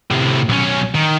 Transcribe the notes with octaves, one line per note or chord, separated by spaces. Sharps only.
A2 C3
B1 C#4
D#3